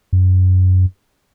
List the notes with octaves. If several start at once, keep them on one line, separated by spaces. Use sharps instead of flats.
F#2